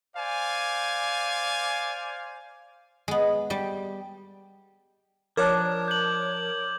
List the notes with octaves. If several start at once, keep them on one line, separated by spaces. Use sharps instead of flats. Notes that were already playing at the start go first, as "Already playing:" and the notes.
C5 D5 F5 G#5
G#3 B3
G3 G4
F3 D4 A#4 C#5 D6 G#6
G6 F#7